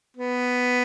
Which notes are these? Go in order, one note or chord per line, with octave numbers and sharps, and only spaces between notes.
B3